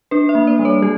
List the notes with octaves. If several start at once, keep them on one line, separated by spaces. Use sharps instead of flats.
D4 B4
E5
A#3
D5
G3
C#5
G3 G4